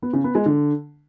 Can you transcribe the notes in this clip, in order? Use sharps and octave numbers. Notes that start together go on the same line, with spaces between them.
B3
C#3
B3
G#3
D3